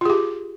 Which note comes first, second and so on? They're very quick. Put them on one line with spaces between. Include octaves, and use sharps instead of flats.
F4 G#4 G4